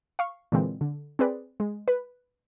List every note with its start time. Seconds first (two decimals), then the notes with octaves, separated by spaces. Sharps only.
0.19 F5 C#6
0.52 A#2 D3 E3 G#3 C4
0.81 D3
1.19 C4 G#4 B4 D5
1.60 G#3
1.88 B4